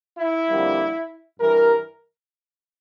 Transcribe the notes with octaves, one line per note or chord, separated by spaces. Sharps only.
E4
F2 D3 G3 A#3
G2 E3 G3 A#4